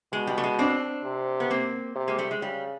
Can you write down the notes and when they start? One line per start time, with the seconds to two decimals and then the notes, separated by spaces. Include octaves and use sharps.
0.12 B2 G#3
0.27 G3
0.38 A3
0.44 G#3
0.59 C4 D4
1.04 C3
1.40 B3
1.50 A#3 C4
1.96 C3
2.08 G#3 A#3
2.18 G3 A3
2.31 G#3
2.42 C#3 G3